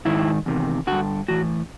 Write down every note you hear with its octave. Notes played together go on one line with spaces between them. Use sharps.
G#2 D#3 E4
E2 C3 D#3
G2 D3 F#4
A2 E3 F#4